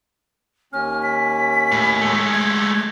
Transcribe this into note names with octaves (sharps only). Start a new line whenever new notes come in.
D#2 C#4 F6
B6
A2
G#3 A3
G#6